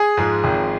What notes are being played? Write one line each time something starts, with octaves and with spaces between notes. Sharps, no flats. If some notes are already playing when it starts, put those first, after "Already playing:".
Already playing: G#4 G#5
G#2 F3 G#3
G#1